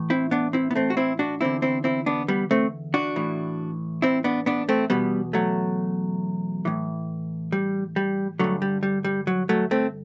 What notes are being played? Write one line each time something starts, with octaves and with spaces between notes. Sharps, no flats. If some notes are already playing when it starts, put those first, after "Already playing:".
Already playing: A2 E3
C4 E4
B3 D4
C4 E4
B3
A3 C4
F#4
C4 E4
D4 F#4
E2 D3 C4 E4
C4 E4
C4 E4
B3 D4
G3 B3
A3 C4
D4 F#4
A2 E3
C4 E4
B3 D4
B3 D4
A3 C4
E2 B2 G3 B3
F#3 A3
A2 E3
G3
G3
G2 D3 F#3 A3
G3
G3
G3
F#3
F#3 A3
A3 C4